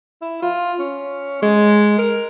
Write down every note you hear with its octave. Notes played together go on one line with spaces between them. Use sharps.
E4
F4
C#4
G#3
A#4